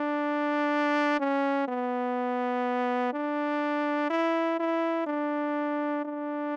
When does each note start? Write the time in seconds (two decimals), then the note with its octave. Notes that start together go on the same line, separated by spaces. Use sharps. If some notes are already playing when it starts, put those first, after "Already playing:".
Already playing: D4
1.20 C#4
1.68 B3
3.13 D4
4.10 E4
4.59 E4
5.07 D4
6.05 D4